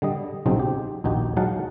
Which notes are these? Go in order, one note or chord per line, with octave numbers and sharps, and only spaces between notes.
D3 G3 D#5
B1 C#3 F#3 C4 D#4
G4
A#1 D#2 D#4 F#4 G4
F#3 G#3 D#4 F5 F#5 A5